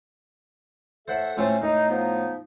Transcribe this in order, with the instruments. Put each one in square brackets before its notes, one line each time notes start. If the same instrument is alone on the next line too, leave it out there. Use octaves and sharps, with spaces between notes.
[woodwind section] A2 A4 E5 [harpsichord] C5 F#5
[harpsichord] A2 A3 C4 [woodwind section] C#4 F4
[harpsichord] A2 [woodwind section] D#4
[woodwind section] F3 B3 D#4